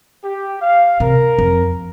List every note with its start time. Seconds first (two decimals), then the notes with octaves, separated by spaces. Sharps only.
0.23 G4
0.62 F5
1.00 C3 A#4
1.39 F2